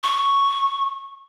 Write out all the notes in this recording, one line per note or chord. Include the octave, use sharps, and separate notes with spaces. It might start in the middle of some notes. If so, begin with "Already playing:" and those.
C#6